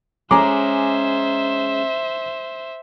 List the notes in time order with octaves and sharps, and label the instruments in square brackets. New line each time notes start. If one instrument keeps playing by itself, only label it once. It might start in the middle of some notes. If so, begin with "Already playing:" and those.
[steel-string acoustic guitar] G#3 C#4 [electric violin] C5 E5 [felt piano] G#5 A#5 D6